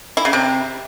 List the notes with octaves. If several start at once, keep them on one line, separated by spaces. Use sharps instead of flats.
E4
C#3
C3